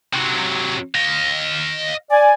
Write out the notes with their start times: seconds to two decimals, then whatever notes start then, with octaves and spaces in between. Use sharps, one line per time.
0.13 C3 F#3
0.95 D#5 F5
2.11 D5 G#5